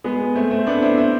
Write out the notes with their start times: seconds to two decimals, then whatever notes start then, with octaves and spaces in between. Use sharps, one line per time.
0.04 G#3 B3
0.35 A3 C4
0.51 A3 C4
0.67 B3 D4
0.82 C4 E4
0.98 C4 E4